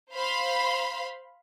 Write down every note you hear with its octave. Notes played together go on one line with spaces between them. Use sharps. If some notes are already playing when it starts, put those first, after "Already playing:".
C5 F5 B5 C6